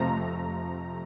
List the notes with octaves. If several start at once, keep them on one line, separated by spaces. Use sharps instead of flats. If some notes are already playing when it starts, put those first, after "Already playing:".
Already playing: F2 C3 F3 A3 A#5